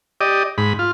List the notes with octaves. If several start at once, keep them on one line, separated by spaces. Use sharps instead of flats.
G4 D5 D#5
G#2 B5
F4